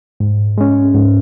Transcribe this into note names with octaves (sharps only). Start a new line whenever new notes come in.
G#2
G#3 C#4
G#2